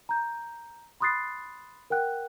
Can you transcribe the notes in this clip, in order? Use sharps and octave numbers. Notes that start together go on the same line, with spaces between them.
A#5 G6
B5 C6 D#6 F#6 A6 C7
A#4 F#5 G5 F#6